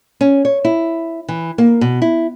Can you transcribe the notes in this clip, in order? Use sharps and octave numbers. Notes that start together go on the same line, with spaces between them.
C#4
C#5
E4
E3
A#3
B2
E4